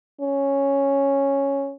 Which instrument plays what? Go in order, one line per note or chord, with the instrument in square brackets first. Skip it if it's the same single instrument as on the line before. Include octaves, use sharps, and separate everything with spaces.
[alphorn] C#4